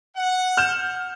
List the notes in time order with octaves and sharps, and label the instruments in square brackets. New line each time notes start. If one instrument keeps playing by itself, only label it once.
[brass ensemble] F#5
[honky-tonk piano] F6 G6 E7